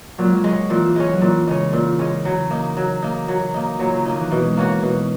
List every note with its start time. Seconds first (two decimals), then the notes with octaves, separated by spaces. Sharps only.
0.18 A#2 F#3
0.27 G#3
0.35 F#3
0.44 G#3 C#4
0.70 A#2 E3
0.96 G#3 C#4
1.12 F#3
1.21 A#2 E3
1.47 C#3 G#3 C#4
1.73 A#2
1.99 G#3 C#4
2.25 C#3 F#3
2.50 A#3 D#4
2.77 F#3
3.02 A#3 D#4
3.28 F#3
3.54 A#3 D#4
3.79 A#2 F#3
3.93 C#3
4.05 D#3 A#3 D#4
4.18 E3
4.31 B2 E3
4.44 G#3
4.57 A#3 C#4 F#4
4.83 B2 E3